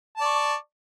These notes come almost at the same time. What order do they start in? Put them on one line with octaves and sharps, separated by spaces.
A5 D5 C#6